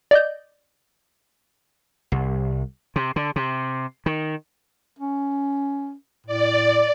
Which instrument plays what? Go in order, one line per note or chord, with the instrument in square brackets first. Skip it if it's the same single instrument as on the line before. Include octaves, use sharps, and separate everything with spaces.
[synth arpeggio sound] D5 D#5 G6
[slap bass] C2
C3
D3
C3
D#3
[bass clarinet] C#4
[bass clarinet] A2 [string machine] D5